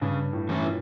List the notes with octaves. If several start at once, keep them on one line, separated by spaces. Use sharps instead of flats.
G2 C#3
A2
E3 A3 C#4 E4
A#2